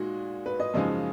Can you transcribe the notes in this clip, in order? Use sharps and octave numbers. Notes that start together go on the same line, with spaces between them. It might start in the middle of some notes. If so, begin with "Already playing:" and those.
Already playing: A#2 G#3 D#4 F#4
B4
D#5
F#2 C#3 F3 G#3 D#4 D#5